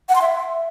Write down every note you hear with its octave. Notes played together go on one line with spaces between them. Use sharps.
F#5
C6
E5